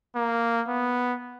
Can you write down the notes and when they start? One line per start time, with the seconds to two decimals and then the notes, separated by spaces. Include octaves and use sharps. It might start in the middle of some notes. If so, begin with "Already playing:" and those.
0.15 A#3
0.68 B3